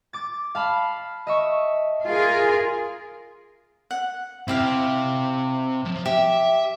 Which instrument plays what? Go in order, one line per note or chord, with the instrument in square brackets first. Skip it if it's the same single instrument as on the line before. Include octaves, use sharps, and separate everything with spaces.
[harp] D6 A6
F5 A5 B5
D#5 E5 C#6
[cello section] F4 G#4 A#4
[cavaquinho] F#5
[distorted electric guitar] C3 [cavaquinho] E4 G4 F5
[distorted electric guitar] F3
[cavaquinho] G4 [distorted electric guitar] E5